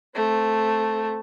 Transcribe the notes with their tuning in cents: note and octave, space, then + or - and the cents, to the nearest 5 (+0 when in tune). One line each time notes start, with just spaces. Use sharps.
A3 +0 C4 +0